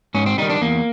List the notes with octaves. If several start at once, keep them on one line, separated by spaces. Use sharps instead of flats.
G#2 C#4
C4
D#3 G3 D#4
D4
E2 A#3